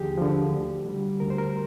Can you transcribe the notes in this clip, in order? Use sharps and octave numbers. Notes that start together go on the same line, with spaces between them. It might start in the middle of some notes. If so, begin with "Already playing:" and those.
Already playing: D#2 D3 F3 G4 G#4
D3 F3
D2
D3 G3
D2 A#4
C5
A#4